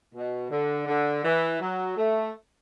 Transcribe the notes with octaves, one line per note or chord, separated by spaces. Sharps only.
B2
D3
D3
E3
F#3
A3